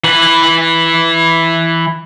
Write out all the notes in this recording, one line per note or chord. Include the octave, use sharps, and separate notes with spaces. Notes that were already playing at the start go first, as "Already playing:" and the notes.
E3 B4